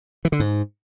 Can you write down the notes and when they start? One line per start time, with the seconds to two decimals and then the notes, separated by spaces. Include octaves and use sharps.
0.25 E3
0.32 D3
0.40 G#2